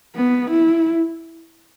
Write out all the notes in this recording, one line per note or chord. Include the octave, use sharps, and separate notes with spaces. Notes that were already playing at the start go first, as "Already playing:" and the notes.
B3
E4